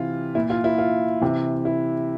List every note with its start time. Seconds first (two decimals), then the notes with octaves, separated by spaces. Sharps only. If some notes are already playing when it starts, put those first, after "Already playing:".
Already playing: C3 E3 F4
0.35 A#2 E4
0.50 F4
0.64 E4
0.78 F4
1.21 C3 E3
1.65 E4